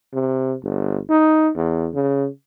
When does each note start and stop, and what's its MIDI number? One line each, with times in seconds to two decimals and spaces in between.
0.14 0.55 48
0.64 0.99 31
1.10 1.51 63
1.56 1.89 40
1.94 2.28 49